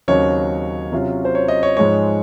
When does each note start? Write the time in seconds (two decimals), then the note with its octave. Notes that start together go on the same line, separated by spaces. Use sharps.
0.08 D#2 C#3 F#3 C4 D#4 C#5
0.92 C3 F#3 C#4 F4
1.25 C5
1.35 C#5
1.48 D#5
1.63 C#5
1.77 G#2 F3 G#3 D#4 C#5